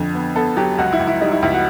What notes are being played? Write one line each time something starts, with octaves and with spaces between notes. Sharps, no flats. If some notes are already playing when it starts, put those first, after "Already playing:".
Already playing: F2 D3
B3
B3 A4
F#3 G4
C#2 F#4
E4
C#2
E4
G3 D#4
E4
C#2 E4
F#4